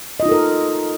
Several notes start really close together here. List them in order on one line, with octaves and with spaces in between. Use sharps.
D#5 F4 D#4 A4 A#4